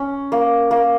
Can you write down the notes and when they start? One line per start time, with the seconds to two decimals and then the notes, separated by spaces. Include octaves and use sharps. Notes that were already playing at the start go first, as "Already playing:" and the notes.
Already playing: C#4
0.32 A#3
0.71 A#3